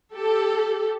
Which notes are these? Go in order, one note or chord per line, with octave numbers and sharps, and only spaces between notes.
G4 A4